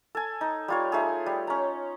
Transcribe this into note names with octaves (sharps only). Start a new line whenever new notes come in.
A4 G#5
D#4
G3 F4 C#5
A3 D#4 G#4
G3
C#4 A#5